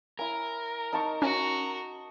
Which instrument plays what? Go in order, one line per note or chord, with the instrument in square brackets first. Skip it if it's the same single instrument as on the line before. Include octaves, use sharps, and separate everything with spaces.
[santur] E4 G#5 [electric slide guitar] A#4
[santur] D#4 A5 C#6
[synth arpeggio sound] C#4 [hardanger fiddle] F#4 A#5